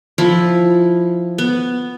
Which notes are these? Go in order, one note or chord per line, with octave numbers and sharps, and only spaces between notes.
F3 E4
B3